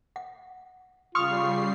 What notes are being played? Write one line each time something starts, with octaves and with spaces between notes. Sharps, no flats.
F#5
C#3 G3 F4 C6 C#6 D#6 F6 C7